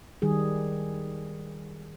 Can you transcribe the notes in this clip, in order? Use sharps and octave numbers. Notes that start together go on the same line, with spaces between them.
D#3 G3 G#4